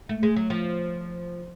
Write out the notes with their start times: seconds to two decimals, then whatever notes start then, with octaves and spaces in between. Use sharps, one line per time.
0.09 A3
0.23 G#3
0.36 F#3
0.50 F3